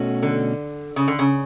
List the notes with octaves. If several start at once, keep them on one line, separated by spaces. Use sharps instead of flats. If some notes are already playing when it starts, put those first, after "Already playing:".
Already playing: B2 A3 C#4 F#4
D3
C#3
D3
C#3